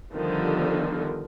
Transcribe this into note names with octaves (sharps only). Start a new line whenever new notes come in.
D3 D#3 F3 G3 B3